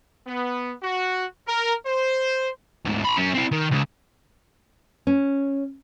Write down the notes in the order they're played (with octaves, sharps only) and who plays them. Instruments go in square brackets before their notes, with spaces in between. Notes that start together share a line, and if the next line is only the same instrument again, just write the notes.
[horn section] B3
F#4
A#4
C5
[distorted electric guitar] D2 G#2
A#5 B5
F#2 C#4
C4 E4
D#3
C#2 C#3
[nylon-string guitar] C#4